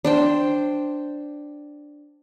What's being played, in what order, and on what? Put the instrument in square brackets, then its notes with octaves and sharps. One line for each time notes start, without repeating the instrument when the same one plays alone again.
[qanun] D4 C5 G5